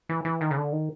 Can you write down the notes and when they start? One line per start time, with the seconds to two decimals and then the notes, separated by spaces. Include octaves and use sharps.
0.09 E3
0.25 E3
0.41 D#3
0.51 C#3
0.57 D3
0.72 D#3